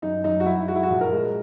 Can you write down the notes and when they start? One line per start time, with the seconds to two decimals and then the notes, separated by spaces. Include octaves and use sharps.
0.02 F#2 D#4
0.24 F#2 D#4
0.40 F#4
0.46 F#2 E4
0.68 G#3 F#4
0.76 E4
0.83 F#4
0.90 A#1
1.01 A#4
1.12 G#3